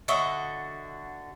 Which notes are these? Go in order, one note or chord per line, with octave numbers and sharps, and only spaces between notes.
D3 F#4 D#5 E5